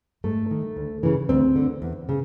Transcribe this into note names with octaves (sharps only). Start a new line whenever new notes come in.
G#2 A3
D#3
D2
C#3 E3
D2 C4
D3
E2
C#3